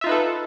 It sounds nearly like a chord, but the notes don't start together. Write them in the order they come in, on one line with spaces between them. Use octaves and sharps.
E5 F4 D#4 B4 A4